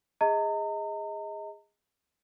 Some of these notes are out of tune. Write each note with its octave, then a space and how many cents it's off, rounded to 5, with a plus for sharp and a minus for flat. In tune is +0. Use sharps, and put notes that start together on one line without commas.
G#4 -20 D#5 +25 A#5 -35